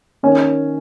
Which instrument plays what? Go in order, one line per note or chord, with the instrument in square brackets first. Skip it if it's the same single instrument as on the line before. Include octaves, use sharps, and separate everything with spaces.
[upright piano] D#3 C#4